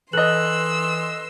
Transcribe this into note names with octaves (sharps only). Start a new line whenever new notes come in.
E3 A4 D#5 C6 E6 F#6 F#7